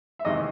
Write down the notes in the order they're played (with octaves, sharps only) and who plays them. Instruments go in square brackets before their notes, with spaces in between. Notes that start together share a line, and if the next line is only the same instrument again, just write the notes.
[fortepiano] E5
E2 C3 D#3 G#3 D#5